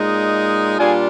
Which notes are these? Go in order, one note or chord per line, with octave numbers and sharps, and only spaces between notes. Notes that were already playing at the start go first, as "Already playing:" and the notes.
Already playing: A#2 G#3 D#4
A#2 G3 D4 F4 G#4 G#5